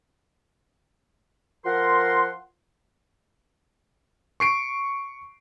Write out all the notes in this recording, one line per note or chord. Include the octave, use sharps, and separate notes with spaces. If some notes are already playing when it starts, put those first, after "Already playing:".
F3 A#4 F#5 C6
C#6 C7 D7